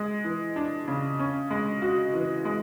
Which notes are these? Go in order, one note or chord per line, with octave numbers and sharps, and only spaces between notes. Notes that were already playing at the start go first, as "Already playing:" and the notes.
Already playing: G#3
E3
D4
C#3
C#4
G#3
F#4
E3
G#3